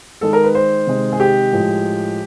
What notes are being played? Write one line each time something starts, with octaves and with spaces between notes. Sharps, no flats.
D#3 G#3 A4
A#4
B4
C5
C3 D#3 G#3
G#4
G4
A2 F3 G#3